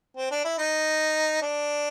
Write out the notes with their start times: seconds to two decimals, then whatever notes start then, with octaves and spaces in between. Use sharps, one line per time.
0.17 C4
0.31 D4
0.45 E4
0.58 D#4
1.42 D4